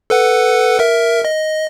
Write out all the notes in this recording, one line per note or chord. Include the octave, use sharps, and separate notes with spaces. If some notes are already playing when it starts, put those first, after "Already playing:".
A4 B4 F#5
A#4 E5
D#5